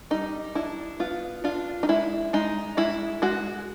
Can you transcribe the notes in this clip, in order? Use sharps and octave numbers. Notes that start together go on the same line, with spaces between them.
G3 D#4
D4 E4
B3 F4
D4 F4
D#4
G#3 E4
G#3 D#4
G#3 E4
G#3 F#4